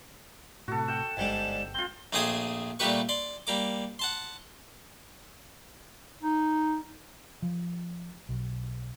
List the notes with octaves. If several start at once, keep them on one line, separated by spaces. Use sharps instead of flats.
A2 C3 F#4 A4
F#5 G5 E7
G1 G#2 G3 D4
C4 F4 G7
A#1 A3 C4 G#4 G#5 D#6
A#2 G3 A3 G4 B4 C#6
D5 C6
G3 A#3 D6
F#5 A5 C6
D#4
F3
B1